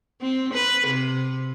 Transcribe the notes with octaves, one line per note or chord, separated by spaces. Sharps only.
C4
B4
C3